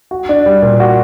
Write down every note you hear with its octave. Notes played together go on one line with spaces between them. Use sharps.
F#4
D4
G3
A#2
F#4